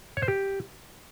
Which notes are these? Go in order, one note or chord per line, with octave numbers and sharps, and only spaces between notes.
C#5
C5
G4